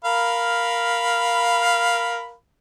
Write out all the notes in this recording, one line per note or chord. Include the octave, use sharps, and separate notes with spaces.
A#4 F5 B5